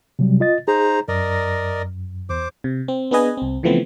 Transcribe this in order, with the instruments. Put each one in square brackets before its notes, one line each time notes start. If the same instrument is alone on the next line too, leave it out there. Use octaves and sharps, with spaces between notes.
[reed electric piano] C3 F#3 G3
F4 D#5 A6
[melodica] D#4 C5 A#5 [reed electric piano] G#4
[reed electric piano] F#2 [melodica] A#4 D5 D#5
[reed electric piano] E2 [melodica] C5 D6
[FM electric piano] C3
C4
B3 D4 G#4 B4 D#5 G#5
C2 C4
C#3 E3 F3 A3 B3 C4